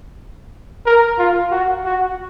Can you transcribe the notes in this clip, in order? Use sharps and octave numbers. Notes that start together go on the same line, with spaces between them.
A#4
F4
F#4
F#4